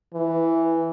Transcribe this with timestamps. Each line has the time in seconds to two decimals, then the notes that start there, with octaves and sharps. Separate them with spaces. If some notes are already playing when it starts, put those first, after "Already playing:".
0.13 E3